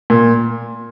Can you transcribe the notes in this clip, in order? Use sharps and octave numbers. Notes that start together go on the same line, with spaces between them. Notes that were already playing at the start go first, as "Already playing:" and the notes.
A#2